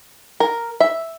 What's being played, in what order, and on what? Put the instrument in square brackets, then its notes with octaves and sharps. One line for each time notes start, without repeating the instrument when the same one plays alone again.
[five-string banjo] A#4
E5